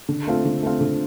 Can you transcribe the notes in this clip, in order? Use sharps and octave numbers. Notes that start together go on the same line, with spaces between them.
D3
A3 C4 F4
D3
A3 C4 F4
D3